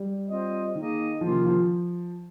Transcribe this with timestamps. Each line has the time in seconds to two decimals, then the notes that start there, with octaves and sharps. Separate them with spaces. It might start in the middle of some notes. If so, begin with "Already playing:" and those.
Already playing: G3
0.27 C4 F4 C5 D#5
0.74 D#3 A#3 D#4 G#4 D#5
1.21 C3 D#3 F3 A#3 C#4 F4
1.45 F3